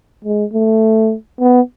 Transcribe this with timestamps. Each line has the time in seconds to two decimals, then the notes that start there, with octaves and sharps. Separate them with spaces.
0.24 G#3
0.53 A3
1.40 B3